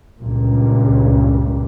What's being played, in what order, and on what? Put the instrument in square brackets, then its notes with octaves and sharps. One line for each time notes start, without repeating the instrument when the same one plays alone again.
[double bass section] C#2 G2 A#2